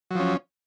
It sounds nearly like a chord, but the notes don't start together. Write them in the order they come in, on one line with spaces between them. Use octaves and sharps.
F#3 F3 C#4